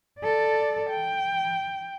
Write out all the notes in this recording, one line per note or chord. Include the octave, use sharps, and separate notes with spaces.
A4 D5
G5